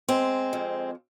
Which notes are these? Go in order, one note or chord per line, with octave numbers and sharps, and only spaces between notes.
G#3 C4
F2